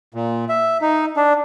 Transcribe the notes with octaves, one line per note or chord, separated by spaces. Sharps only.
A#2
E5
D#4
D4